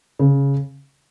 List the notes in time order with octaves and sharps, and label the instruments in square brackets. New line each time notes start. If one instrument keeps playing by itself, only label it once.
[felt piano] C#3